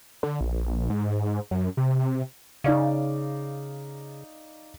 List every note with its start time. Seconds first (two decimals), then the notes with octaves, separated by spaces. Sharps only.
0.23 D3
0.40 A#1
0.90 G#2
1.51 F#2
1.77 C3
2.64 C#3 D#4 D5 F5